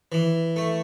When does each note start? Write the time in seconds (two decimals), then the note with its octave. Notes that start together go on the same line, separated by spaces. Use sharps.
0.12 E3
0.56 A3